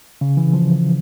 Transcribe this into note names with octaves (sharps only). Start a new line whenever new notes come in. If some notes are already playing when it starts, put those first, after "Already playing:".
C#3
E3
F3